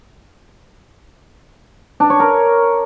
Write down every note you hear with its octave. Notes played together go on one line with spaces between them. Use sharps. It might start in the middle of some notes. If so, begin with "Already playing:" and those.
D4
C#5
A#4